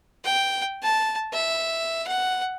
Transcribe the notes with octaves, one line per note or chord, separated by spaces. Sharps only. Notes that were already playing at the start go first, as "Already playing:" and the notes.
G5
A5
E5
F#5